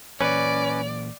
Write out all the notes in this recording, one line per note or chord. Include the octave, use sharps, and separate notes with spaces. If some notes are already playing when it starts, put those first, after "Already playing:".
A#2 E3 A#3 C#4 B4 D5